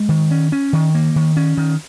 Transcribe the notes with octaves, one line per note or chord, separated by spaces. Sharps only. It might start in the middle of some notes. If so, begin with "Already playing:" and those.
Already playing: G#3
D#3
C#4
C#4
D#3
A#3
D#3
C#4
D#3